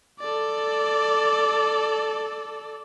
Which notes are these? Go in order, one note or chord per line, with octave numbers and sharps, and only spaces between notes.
A4 D5